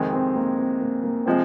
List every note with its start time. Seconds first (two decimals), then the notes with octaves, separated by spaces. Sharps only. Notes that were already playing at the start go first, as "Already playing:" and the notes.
Already playing: F2 C3 D#3 G#3 C4
0.13 C4
0.35 A#3
0.58 C4
0.81 A#3
1.04 A#3
1.26 C3 F3 G#3 C4